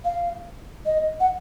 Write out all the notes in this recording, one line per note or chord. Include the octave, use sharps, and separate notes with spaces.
F5
D#5
F#5